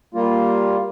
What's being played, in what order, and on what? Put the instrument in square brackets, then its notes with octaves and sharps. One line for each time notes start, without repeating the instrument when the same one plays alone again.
[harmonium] G3 A#3 F4